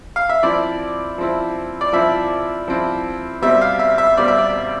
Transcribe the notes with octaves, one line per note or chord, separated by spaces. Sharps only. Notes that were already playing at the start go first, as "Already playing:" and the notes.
F5
E5
F3 C4 E4 D5
F3 C4 E4
D5
F3 C4 E4 E5
F3 C4 E4
B2 G3 C4 E5
F5
E5
E5
B2 G3 C4 D5
E5
D5